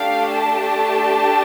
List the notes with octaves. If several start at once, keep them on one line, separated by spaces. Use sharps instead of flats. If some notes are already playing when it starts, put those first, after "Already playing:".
Already playing: A3 D4 G4 F5
A5